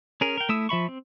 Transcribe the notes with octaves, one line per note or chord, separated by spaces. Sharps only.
C#4 G#4 A#4
A#4 G5
A3 E4 D#6 E6
F3 E5 B5 C#6
C4